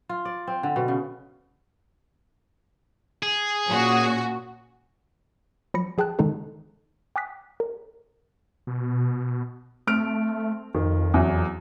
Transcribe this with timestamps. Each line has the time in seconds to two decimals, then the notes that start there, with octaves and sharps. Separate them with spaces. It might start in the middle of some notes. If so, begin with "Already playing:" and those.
0.09 F4
0.25 D5
0.47 C4
0.63 D3
0.76 B2
0.88 C#3
3.23 G#4
3.69 A#2 C#4 F#4
5.74 F3 F#3 B5 A#6 C#7
5.98 F3 G#4 G5 A5 F#6
6.19 D3 D#3 G#3 D#4 A4
7.16 G5 G#5 D6 D#6 F#6 B6
7.60 A#4
8.67 B2
9.87 A3 C4 F6 D7
10.75 F2 D#3
11.14 E2 E3 F#3